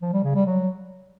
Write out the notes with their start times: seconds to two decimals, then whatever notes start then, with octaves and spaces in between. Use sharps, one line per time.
0.02 F3
0.13 G3
0.24 C#3
0.35 G3
0.46 F#3